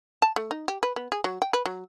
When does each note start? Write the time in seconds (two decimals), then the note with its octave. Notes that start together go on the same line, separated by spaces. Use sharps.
0.22 A5
0.36 A3
0.51 D#4
0.68 G4
0.83 B4
0.96 B3
1.12 G#4
1.24 F#3
1.42 G5
1.53 B4
1.66 F#3